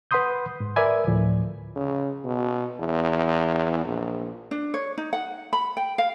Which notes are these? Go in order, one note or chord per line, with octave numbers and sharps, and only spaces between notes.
B4 F#5 B5 C6 D#6 G6
G#2
A#4 B4 D5 E5 G#5 B5
D2 A2 F3
C#3
B2
E2
A#1
D4
C#5
D#4
F#5
B5
G5
F5